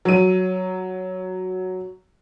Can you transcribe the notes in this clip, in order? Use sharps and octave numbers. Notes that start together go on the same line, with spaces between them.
F#3 D#7